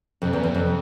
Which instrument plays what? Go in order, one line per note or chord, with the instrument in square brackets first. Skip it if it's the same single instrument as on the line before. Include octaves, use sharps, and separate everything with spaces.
[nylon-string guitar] F2 [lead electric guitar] C3
[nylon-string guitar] E2
E2
F2